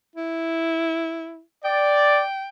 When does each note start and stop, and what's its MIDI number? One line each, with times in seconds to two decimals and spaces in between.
0.16 1.41 64
1.65 2.23 74
1.65 2.48 79